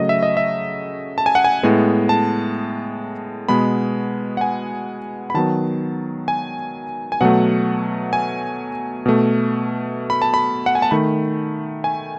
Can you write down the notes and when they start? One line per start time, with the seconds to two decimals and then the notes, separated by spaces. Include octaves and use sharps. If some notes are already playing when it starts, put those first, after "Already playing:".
Already playing: C#3 F#3 A3 D#5
0.09 E5
0.23 D#5
0.37 E5
1.18 A5
1.26 G#5
1.35 F#5
1.44 G#5
1.63 A2 G#3 B3
2.09 A5
3.49 B2 G#3 B3 B5
4.37 F#5
4.41 G#5
5.30 B5
5.34 D#3 F#3 B3 A5
6.28 G#5
7.12 G#5
7.21 B2 F#3 A3 F#5
8.13 G#5
9.06 B2 A3
10.10 B5
10.22 A5
10.34 B5
10.66 F#5
10.75 G#5
10.82 A5
10.91 D#3 A3 B5
11.84 G#5